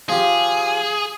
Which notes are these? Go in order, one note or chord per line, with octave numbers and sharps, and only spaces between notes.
F3 F4 G4 G#4